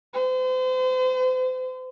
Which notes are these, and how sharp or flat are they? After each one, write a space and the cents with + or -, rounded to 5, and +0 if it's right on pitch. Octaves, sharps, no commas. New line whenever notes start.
C5 -40